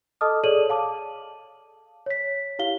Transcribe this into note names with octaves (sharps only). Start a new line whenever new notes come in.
A4 D#5 A5 D6 D#6 F6
G#4 A4 C#5 D5 D#7 F#7
F5 A5 D6
C#5 B6
E4 G4 F5 G7